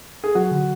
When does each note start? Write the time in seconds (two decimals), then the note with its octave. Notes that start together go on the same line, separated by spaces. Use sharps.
0.24 G#4
0.35 F#3 F#4
0.51 D3